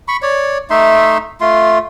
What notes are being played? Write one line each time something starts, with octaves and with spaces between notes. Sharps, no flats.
B5 C#6
C#5 D5
A3 D#4 E5 C6
A3 F4 C6